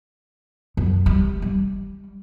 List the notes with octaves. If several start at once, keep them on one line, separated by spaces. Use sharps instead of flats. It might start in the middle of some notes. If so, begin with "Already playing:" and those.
F#2
G3
G3